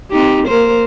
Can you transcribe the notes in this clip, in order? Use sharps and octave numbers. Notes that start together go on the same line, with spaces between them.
C4 D#4 G4
A#3 A#4 C5